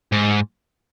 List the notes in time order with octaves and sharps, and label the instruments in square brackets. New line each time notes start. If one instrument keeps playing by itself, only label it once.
[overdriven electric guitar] G#2